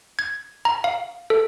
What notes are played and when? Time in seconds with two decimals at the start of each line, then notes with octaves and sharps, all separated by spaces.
0.19 G#6
0.65 A#5
0.84 F5
1.30 A4